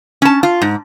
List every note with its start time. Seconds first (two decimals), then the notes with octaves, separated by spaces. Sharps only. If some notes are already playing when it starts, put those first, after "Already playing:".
0.22 C#4 A5
0.43 F4
0.62 G#2